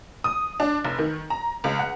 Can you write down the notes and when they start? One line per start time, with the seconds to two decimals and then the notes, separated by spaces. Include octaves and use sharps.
0.24 D#6
0.60 D4
0.85 F1
0.99 D#3
1.30 A#5
1.64 C#2
1.79 F#5